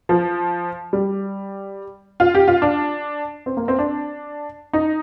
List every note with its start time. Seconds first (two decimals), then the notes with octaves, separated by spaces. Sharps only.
0.09 F3
0.93 G3
2.20 F4
2.35 G4
2.48 F4
2.62 D4
3.46 C4
3.57 A#3
3.68 C4
3.79 D4
4.73 D#4